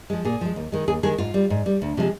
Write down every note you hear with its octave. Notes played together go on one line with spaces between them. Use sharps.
F3 G#3
A#2 G#4
F3 G#3
D#2
D#3 G#3
D#2 G#4
D#3 G#3 G#4
G#2 F4
G3
G#2
G3
D2
C3 F3 G#3